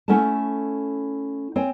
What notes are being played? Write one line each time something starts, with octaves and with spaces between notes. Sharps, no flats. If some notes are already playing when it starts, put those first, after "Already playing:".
A3 C#4 E4 A4 F#5 A5
C4 C#5 G5 G#5